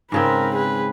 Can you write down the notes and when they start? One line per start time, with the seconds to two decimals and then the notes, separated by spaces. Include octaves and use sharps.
0.12 G#2 C#3 C4 A#4 B4
0.56 G#4 B4